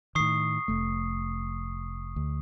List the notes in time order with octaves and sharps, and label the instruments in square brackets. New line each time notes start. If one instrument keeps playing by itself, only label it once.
[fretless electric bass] A2 D#3 [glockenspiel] C#6 D#6 C7
[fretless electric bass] F1 A3
D2